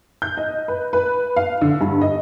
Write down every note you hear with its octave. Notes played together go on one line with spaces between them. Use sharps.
G6
D#5
B4
B4
F5
D3
G2
D#5